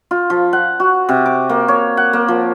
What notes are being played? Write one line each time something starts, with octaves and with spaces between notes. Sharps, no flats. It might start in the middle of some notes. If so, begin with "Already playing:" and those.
F4
F3
F#5
F#4
C3
D6
A#3
C#5
F#5
A#3
F3